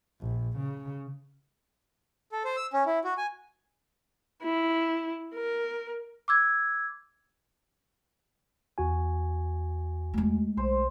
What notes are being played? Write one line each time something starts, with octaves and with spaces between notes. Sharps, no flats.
A#1
C#3
A4
C5
E6
C#4
E4
F#4
G#5
E4
A#4
D6 E6 G#6
E2 F#4 G#5
G#3 A3
B1 C5